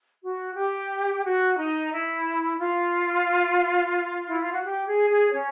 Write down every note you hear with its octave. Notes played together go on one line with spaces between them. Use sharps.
F#4
G4
F#4
D#4
E4
F4
E4
F4
F#4
G4
G#4
G#4
C#4 C#5